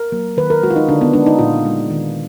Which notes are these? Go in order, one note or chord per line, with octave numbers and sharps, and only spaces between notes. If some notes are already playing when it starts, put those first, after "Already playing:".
Already playing: A#4
F#3 A#3
D#3 B4
A#4
G#3 F#4
F4
D#4
D3 D4
B3
G#3 D4
D#4
A#2 F4
G#3
D#3